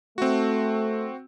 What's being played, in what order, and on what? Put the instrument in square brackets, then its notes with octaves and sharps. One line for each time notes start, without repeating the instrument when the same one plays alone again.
[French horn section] A3 [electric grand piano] C4 F#4